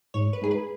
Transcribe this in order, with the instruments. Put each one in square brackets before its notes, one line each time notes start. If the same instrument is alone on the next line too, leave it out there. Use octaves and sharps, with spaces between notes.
[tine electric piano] G#2 [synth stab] C#5
[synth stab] B4
[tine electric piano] G#3 D#4 [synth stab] G#4
[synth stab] B4